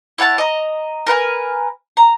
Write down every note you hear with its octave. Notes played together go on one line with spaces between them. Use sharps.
E4 C#5 F#5 A5
D#5 A#5
A#4 B4 F#5 G#5
A#5